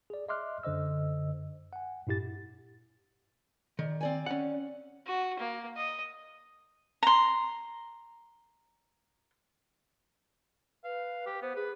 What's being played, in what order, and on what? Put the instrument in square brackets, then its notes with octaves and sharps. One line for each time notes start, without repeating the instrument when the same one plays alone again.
[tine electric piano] G#4 D5
D#5 E5 C6 D6 F6 F#6
F#2 D3 C5 D#5 E6
F#5 G#5
G2 A#2 E4 G4 A6
[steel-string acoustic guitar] A#2 [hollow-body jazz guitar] D#3
[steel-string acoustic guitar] C4 D5 G#5
[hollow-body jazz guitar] C#4 F#5
[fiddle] F#4
A#3
D#5
[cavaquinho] A#5 C6
[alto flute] B4 [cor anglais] F5
[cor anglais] G4
[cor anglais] B3 [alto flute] C5
[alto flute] G#4 [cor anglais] B4